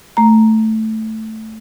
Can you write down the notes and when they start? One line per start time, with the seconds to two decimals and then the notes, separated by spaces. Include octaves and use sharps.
0.17 A3 A#5